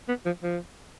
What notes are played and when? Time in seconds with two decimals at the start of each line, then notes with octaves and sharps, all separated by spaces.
0.08 B3
0.26 F3
0.43 F3